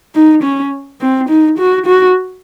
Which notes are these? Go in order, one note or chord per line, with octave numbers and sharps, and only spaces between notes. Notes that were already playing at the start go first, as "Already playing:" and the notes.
D#4
C#4
C4
D#4
F#4
F#4